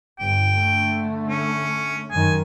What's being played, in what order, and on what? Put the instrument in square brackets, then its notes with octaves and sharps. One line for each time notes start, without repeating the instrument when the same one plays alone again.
[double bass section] G1 [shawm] G5
[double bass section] D3 A3
[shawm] C#4
[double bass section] F#2 D#3 [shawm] G#5